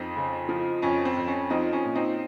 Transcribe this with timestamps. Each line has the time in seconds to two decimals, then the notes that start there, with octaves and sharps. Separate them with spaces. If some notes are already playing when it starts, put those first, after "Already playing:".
Already playing: F2 C4 D#4
0.16 C#3
0.49 F3
0.82 F2 C#4
1.05 C4
1.16 F2
1.28 C#4
1.50 F3 C4 D#4
1.73 C#4
1.84 A#2
1.95 C4 D#4